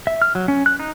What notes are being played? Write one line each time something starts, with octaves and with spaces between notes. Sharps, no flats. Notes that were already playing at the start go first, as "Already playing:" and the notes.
E5
F6
F#3
C#4
F#6
D#4